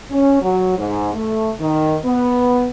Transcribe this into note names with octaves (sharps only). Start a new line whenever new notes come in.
C#4
F#3
G#2
A3
D#3
B3